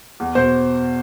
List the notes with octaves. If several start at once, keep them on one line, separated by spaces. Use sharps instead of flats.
E2
B2 C5